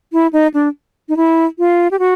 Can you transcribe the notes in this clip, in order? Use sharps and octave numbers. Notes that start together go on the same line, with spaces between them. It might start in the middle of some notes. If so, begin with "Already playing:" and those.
E4
D#4
D4
D#4
E4
F4
G4
F#4